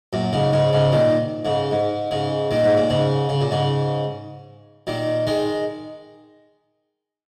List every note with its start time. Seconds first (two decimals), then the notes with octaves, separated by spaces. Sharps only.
0.13 F#2 A#2
0.33 G#2 C#3
0.53 G#2 C#3
0.73 G#2 C#3
0.92 A#2 D#3
1.45 G#2 C#3
1.71 G#2
2.11 G#2 C#3
2.51 A#2 D#3
2.64 G#2
2.77 A#2
2.90 G#2 C#3
3.29 C#3
3.41 A#2
3.51 G#2 C#3
4.87 A#2 D#3
5.27 D#3 G#3